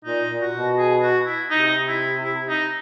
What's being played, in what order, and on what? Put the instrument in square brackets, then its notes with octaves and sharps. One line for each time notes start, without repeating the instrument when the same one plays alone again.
[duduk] A#2 [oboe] D#4
[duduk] A#2
[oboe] F#4
[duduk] B2
[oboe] G#4
F#4
E4
[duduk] C3 [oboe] D#4
[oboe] E4
E4
D#4